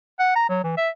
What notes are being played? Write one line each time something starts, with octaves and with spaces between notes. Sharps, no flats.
F#5
A#5
F#3
E3
E5